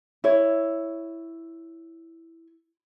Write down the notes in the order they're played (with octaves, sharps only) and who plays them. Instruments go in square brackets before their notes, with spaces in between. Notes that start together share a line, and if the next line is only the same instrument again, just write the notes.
[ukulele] E4 C#5